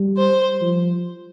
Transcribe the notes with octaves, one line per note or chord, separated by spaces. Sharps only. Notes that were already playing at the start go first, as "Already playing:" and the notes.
Already playing: G3
C5
F3